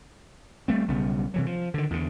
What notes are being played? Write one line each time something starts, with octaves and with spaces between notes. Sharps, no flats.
G3 A3 C4
B1 C#3 G3 B3
C3 E3 F#3
F3
D3 D#3
E2 D3